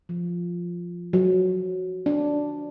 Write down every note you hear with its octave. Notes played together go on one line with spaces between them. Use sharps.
F3
F#3
D4